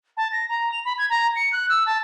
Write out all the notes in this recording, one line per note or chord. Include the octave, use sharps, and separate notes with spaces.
A5
A#6
A#5
F7
B5
G#6
A#5
C#7
F#6
E6
A5